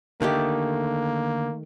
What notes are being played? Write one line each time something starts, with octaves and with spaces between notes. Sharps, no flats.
D3 D#3 A3 A#3 G4